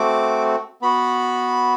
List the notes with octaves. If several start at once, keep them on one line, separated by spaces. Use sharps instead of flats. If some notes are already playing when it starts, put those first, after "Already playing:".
Already playing: A3 C4 F#4 D6
B3 F#4 B5